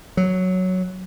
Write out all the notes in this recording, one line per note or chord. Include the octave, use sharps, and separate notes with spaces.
F#3